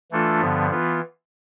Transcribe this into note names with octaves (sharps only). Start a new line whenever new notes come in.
E3 A3 D4 F4 A4
G2 D3 F3 B3
E3 B3 F4